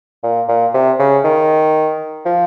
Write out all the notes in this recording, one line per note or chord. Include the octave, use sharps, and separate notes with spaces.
A#2
A#2
C3
C#3
D#3
F3